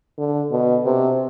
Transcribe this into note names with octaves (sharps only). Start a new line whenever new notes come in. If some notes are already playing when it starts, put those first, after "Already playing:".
D3
B2
C3